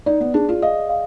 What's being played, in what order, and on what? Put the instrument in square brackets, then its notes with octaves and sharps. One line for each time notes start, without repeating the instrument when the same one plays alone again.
[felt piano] D#4 [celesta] D5
[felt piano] B3
[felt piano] D4 [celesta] G#4
[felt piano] F4
[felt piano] D#5 [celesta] F5
[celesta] F5